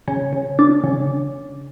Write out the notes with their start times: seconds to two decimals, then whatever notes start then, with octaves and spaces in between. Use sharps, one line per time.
0.08 C#3
0.33 C#3
0.59 D4
0.84 C#3